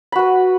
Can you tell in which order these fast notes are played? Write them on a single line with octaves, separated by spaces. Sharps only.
B5 F#4 B4